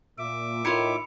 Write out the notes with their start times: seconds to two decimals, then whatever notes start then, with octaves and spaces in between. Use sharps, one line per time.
0.18 A#2 E5 D6
0.65 A2 D#3 E4 F4 B5 C#7